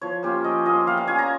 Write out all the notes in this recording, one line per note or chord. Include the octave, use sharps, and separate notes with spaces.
F3 C#5
A#3 C#4 F4 G4
F3 D#5
A#3 C#4 F4 D#5
G3 F5
F5
C#4 F4 G#5
A#5